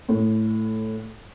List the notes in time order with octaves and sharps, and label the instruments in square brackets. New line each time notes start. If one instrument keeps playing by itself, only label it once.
[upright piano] A2